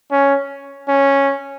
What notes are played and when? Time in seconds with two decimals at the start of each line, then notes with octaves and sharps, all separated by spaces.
0.11 C#4
0.88 C#4